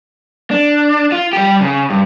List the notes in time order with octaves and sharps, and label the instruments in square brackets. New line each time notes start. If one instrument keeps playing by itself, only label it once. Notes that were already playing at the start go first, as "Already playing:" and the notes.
[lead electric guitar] D4
F4
G3 G4
C#3
G2